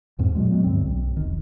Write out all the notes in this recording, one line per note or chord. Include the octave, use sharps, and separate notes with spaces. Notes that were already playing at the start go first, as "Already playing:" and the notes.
D#2 G#2 C4
A#2 F#3 G#3
F#3 G#3 B3
D2 G2 C4
B1
E1 D#3